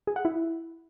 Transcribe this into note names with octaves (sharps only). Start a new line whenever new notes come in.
G#4
F#5
E4